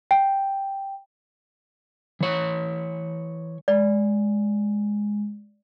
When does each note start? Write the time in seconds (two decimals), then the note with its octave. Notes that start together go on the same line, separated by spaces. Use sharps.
0.11 G5
2.21 E3 C#5
3.68 G#3 D5